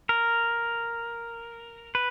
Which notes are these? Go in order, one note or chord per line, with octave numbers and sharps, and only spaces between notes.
A#4
B4